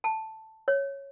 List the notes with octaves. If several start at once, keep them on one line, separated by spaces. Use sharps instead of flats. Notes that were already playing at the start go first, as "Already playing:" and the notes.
A5
C#5